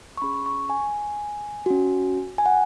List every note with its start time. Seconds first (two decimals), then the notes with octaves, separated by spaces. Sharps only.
0.17 C#6
0.22 C#4 G#4 B5
0.46 C#6
0.70 G#5
1.66 C#4 F#4
2.38 G#5
2.46 F#5